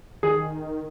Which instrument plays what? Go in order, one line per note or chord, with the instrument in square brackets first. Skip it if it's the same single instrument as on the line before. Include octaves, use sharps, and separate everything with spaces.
[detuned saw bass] D#3 [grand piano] G#4